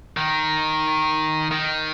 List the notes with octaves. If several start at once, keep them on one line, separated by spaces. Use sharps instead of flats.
D#3
D#3